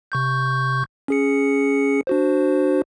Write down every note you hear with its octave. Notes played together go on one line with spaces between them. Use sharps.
C3 C#6 G6
C#4 G#4 C#7
D4 F#4 C5